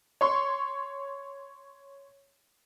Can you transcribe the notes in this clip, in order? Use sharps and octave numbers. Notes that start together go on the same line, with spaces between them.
C#5 C6 C#6